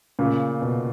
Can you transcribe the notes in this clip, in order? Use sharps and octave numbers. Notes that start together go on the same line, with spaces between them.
A#2 C#3
B2